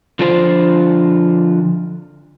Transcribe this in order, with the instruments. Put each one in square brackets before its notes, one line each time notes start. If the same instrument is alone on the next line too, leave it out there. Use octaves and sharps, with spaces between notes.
[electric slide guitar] D3 F3 D4 F4 C5